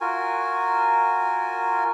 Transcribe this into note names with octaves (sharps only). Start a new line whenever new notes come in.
F4 F#4 A#4 G#5